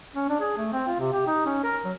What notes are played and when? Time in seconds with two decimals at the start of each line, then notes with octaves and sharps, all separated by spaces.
0.16 C#4
0.29 D4
0.40 G#4
0.58 A3
0.73 C4
0.88 F4
1.00 C3
1.13 G4
1.27 D#4
1.46 C#4
1.64 A#4
1.85 F#3